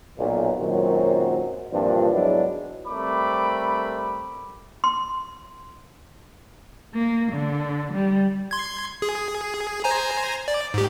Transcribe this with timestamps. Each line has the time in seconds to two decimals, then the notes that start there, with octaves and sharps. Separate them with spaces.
0.19 B1 A#2
0.60 F#2 A#2 D#3 F#3 G#3 C4
1.72 G2 A#2 E3 F3 C4 D4
2.13 G#2 F#3 G#3 B3 D4 E4
2.87 G3 A3 C4 A#4 B5 D6
4.84 C6
6.92 A#3
7.32 D3
7.93 G3
8.51 C6 G#6
9.02 G#4
9.84 C5 G#5 A#5
10.48 D5
10.74 G#2 G4